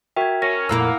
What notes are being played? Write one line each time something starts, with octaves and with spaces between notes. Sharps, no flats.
F#4 A#4 E5 G5 G#6
C#4 A#4 A#6
F2 A#2 A#3 E4 A#4 E6
F#5